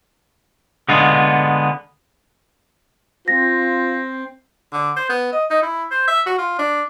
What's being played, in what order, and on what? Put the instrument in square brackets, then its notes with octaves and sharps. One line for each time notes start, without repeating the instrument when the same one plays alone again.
[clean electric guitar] D3 G#3 B3 F4
[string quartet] C4 [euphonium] F4 [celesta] A#6
[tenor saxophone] D3
C5
B3
D#5
D#4
E4
C5
E5
F#4
F4
D4